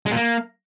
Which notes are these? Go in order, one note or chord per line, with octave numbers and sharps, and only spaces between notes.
G#3
A#2
A#3